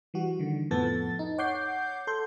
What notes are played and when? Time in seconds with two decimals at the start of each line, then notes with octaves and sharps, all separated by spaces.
0.14 E3 G3 F#4
0.39 D3 D#3
0.71 F2 A2 F3 B3 A4 A6
1.19 D#4
1.38 C#5 F#5 D6 G6 C7
2.07 A4 C6 G6